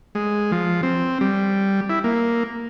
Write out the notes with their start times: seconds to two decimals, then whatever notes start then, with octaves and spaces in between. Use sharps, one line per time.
0.15 G#3
0.52 F3
0.83 C4
1.21 G3
1.90 E4
2.04 A#3